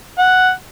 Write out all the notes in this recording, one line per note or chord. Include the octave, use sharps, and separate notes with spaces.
F#5